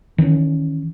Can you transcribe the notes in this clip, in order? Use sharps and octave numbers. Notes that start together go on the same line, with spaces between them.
D#3 E3 C4 C#4